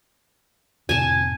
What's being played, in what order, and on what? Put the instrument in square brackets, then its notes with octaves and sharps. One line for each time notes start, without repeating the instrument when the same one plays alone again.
[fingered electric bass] F2 A2 C3 [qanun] G#5 A5